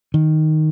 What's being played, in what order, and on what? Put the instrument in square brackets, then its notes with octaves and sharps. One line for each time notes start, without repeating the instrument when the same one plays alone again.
[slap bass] D#3